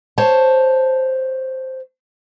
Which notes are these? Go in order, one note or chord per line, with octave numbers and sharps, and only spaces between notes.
C5 C#5 A5